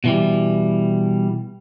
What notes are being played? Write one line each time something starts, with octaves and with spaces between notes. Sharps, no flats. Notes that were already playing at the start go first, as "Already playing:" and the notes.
B2 E3 G3